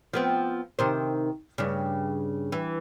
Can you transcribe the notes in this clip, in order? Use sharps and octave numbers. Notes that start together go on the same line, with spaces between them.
F3 B3 C4
C3 D#3 C5
G2 C#3
E3